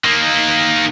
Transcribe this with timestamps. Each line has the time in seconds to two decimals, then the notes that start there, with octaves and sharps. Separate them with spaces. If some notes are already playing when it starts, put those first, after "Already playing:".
0.04 D#3 A#3